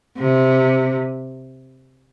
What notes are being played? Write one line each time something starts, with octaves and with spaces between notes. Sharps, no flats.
C3